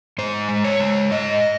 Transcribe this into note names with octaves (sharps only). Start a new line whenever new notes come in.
G#2 C5
G#3
C#5
G#3
G#2 D#5